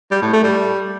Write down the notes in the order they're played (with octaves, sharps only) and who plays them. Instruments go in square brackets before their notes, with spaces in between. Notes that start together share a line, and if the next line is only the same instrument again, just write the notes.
[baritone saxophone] G3
A2
A3
G3